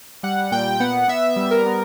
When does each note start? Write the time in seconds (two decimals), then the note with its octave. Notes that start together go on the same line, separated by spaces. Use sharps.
0.23 G3 F#5
0.51 A#2 G5
0.80 B3 F#5
1.08 B3 E5
1.36 G3
1.51 A#4
1.66 B3